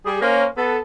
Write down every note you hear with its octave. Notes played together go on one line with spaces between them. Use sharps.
G3 G#4
A#3 C#4 A#4 C5 C#5
B3 A4